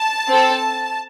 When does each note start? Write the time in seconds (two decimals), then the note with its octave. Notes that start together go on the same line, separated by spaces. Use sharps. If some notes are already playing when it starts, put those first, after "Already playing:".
Already playing: A5
0.28 C4 A4